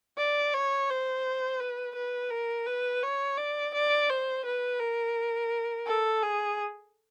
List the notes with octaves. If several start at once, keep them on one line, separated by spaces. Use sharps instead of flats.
D5
C#5
C5
B4
B4
A#4
B4
C#5
D5
D5
C5
B4
A#4
A4
G#4